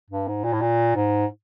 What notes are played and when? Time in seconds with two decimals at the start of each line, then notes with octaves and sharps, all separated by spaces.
0.10 G2
0.28 G#2
0.44 A#2
0.53 A2
0.61 A#2
0.96 G#2